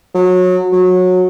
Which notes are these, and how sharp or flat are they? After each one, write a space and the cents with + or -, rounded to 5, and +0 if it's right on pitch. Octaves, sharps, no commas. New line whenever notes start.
F#3 -25
F#3 -20